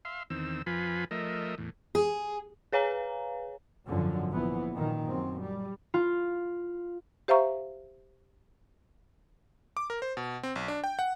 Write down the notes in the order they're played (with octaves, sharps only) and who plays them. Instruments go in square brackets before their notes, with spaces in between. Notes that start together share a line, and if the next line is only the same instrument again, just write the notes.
[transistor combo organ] E5 F5 C6
E2 D#3 C4 E6
F2 F3 F4 B4 G#5 B5
F3 A3 A#4 D#5 E5
E2 A2
[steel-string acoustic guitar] G#4
[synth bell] G#4 B4 C#5 F5 G#5 A#5
[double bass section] G#1 F#2 D3 F3
A#1 E3 B3
F#2 A#2 D#3
F#2 C4
G3
[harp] F4
[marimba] G4 C5 E5 F5 A#5 C#6
[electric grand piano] D6
A#4
C5
B2
C4
B1
D4
G5
F#5